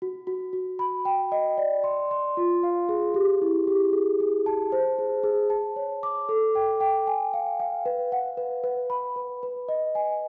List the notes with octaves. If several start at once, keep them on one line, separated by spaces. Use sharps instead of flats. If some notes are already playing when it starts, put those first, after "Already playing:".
F#4
F#4
F#4
B5
G5
D#5
D5
C6
C6
F4
F5
G#4
G4
E4
G4
G#4
G#4
A5
C5
G#4
G#4
A5
C#5
D6
A4
G5
G5
G#5
F5
F5
B4
F#5
B4
B4
B5
B4
B4
D#5
G#5